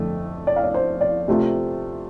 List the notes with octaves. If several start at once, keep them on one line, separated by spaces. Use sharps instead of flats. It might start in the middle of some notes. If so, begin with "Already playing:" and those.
Already playing: F2 D3 A3
D5
F5
D5
C5
D5
C3 A3 F4